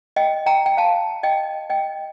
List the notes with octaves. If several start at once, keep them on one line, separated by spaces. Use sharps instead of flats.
D#5 G5
G5 A#5
G5
F5 A5
D#5 G5
D#5 G5